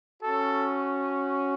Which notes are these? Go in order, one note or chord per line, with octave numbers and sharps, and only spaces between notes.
C#4 F#4 A4